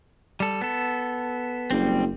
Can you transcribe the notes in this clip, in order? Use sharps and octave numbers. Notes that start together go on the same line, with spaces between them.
G3 A4
B3 A4
F#1 G3 C4